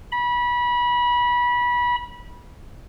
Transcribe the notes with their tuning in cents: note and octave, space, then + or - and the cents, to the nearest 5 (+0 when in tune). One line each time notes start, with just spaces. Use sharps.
B5 -25